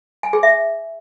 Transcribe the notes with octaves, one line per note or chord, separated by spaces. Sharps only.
G#5
G#4
E5